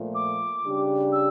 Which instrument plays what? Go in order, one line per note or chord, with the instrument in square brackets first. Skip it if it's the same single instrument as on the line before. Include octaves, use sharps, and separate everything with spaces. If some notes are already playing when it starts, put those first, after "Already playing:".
Already playing: [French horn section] A#2 F3 A3
[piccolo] D6
[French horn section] C#3 G3 D4 G4
[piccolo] E6